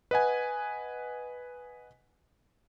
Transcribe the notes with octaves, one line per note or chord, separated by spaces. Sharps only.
B4 D#5 F#5 G#5